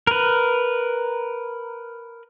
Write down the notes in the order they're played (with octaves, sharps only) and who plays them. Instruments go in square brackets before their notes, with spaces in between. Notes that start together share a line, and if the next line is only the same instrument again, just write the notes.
[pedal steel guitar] A#4 B4